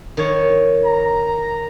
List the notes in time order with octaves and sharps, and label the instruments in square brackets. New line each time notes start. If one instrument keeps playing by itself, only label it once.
[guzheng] D#3 C#5
[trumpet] A#5